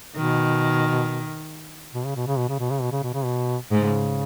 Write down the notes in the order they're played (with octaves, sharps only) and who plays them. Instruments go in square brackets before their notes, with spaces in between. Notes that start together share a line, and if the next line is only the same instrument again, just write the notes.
[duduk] B2 [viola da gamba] D#3
[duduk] B2
C#3
B2
C#3
B2
C#3
B2
C#3
B2
C#3
B2
C#3
B2
[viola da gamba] G#2 [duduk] C#3